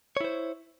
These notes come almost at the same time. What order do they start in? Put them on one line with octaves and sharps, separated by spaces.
C#5 E4 C5